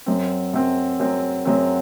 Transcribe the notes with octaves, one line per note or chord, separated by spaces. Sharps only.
F#2 F#3 C4
F#2 F#3 C4
F#2 F#3 C4
F#2 F#3 C4